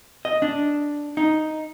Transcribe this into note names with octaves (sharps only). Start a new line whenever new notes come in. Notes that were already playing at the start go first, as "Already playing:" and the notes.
D#5
D4
D#4